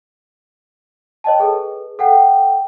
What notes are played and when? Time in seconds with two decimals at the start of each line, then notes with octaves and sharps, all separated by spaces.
1.24 C#5 D#5 G5 A5
1.40 G#4 A4 B4
1.99 A4 F#5 G5